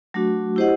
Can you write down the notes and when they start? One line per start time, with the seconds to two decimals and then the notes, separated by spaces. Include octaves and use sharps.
0.14 F#3 A3 D4 F#4
0.56 E4 G4 C5 D#5 F#5